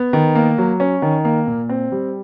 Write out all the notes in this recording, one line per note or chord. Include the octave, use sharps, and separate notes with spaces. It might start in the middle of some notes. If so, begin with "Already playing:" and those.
Already playing: B3
D#3
A#3
F#3
C#4
D#3
A#3
A#2
C4
G3